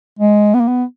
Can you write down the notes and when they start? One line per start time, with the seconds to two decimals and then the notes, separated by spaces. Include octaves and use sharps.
0.19 G#3
0.54 B3
0.61 A#3
0.68 B3